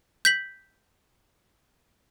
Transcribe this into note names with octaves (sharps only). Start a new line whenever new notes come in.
G6 B6 F#7